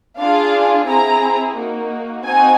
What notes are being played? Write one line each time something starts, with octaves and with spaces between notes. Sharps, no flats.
D4 F4 G#4 F5
C4 E4 G#4 A#5
A#3 D#4 F#4
C4 D#4 F#4 G#5